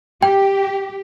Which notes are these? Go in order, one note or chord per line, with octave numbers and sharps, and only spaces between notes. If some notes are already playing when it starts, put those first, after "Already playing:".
G4 G5